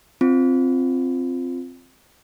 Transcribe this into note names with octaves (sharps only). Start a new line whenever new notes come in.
C4 F4